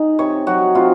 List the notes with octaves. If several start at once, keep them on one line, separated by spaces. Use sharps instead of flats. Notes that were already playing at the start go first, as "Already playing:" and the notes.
Already playing: D#4 G#4
C3 C#5
F#3 F#4
C3 F4